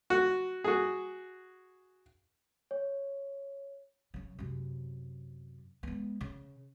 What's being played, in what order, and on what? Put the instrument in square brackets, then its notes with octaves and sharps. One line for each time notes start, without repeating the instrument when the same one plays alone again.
[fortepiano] F#4
F#4 G#4
[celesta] C#5
[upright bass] C#3 F#3
F#2 C3
G#3 B3
C#3